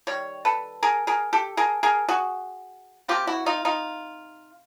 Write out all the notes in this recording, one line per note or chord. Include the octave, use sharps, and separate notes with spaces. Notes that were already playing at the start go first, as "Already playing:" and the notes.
D#3 G3 C#5
A4 B4
G#4 A#4
G#4 A#4
G4 A4
G#4 A#4
G#4 A#4
F#4 G#4
C3 F3 A#3 F4 G4
E4 F#4
D#4 F4
D#4 F4